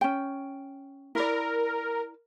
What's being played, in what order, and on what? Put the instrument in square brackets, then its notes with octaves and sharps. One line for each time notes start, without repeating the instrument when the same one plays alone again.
[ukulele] C#4 G5
[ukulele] E4 B4 D5 [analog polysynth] A#4